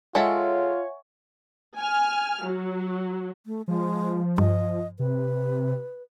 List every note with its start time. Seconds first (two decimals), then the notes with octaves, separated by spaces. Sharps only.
0.15 G#3 F4 A4 C#5 E5 F#5 G#5
1.78 G#5 F6
2.43 F#3
3.45 A3
3.68 F3 G#3
4.38 G2 D#5
4.99 C3 B4